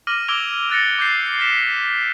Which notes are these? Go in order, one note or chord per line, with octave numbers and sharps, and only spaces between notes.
D6 F6 A#6 D#7 F#7
D6 E6 G#6 D7 F7 G7
F6 F#6 A6 A#6 C#7
D6 G6 A6 C7
F6 A6 B6 E7